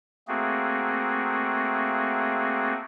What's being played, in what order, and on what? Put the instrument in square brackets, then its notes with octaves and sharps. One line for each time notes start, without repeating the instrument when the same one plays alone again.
[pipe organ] A3 A#3 C4 F#4 G#4